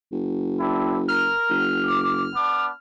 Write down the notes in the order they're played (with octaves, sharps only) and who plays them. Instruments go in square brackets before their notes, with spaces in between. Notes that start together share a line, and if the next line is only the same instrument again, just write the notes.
[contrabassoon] F#1
[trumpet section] C4 D4 E4
[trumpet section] A#4 [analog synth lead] F6
[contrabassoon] F#1
[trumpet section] D6
B3 D4 D6